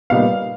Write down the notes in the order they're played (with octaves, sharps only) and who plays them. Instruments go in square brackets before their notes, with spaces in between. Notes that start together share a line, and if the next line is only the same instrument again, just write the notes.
[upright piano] A#2 G3 B3 D#4 F5